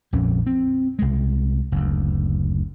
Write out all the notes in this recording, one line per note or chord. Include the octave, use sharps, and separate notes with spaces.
A#1 F2 C#4
C4
C2 G#3
F#1 D2